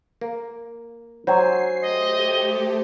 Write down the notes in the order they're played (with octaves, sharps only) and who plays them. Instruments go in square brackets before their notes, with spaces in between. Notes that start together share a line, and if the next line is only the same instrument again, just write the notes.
[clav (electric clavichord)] A#3
[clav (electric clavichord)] F#3 [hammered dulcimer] C5 G#5 [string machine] C7
[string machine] A3 G4 [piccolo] D#5